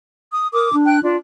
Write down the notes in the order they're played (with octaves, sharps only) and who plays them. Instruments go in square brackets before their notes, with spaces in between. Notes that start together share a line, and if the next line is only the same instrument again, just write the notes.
[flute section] D#6
[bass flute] A#4 [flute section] D6 D#6
[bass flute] D4
[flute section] G5 F#6
[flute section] D4 [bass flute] F4